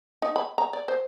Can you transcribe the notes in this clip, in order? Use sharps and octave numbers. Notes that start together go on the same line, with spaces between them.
D#4
B5
A#5
D5
C5